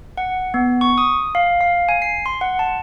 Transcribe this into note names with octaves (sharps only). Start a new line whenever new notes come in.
F#5
B3
C#6
D#6
F5
F5
G#5
C7
C6
F#5
A5